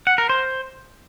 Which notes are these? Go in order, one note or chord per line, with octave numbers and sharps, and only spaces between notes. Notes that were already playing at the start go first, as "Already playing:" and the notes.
F#5
A#4
C5